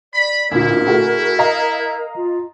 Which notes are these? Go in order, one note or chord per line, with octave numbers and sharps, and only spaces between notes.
D5 B5
A1 D2 A#2 E4 A#4
A3 F#4 G#4
D#5 F5 A#5
F4